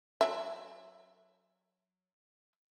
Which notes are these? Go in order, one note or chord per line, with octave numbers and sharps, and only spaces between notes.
F#3 E5